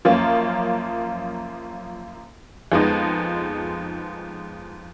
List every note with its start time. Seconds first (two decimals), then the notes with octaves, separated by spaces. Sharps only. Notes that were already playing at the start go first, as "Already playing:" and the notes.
0.05 F#2 F3 A#3 C#4 F4
2.72 F2 F3 G#3 B3 D#4